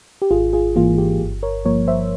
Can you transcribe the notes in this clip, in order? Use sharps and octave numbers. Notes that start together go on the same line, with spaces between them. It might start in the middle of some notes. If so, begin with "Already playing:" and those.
G4
G#1 F4 G#4
F4 G#4
G#2 E3 A#3 F4
G4
G1
A#4 C#5
G2 F3 A#3 A#4 C#5
C5 E5